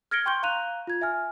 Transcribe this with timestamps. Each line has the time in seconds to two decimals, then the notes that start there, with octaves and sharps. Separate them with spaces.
0.11 F6 G#6 A#6 C#7 D7 G7
0.26 G5 C6 C#6 G6 G7
0.43 F5 A#5 F#6 D#7 F7
0.87 F4 G#6
1.01 E5 G#5 F6